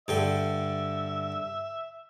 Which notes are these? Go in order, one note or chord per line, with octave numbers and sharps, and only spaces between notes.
G2 D3 E5 G5